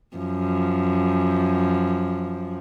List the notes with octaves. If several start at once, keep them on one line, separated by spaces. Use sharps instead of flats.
F#2 F3